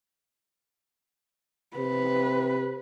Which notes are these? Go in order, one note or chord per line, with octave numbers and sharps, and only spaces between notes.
C3 B4